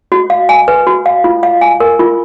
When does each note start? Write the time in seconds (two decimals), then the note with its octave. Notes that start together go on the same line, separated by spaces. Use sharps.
0.12 F#4
0.30 F5
0.49 G#5
0.68 B4
0.87 F#4
1.06 F5
1.24 F4
1.43 F5
1.61 G#5
1.80 A#4
2.00 F4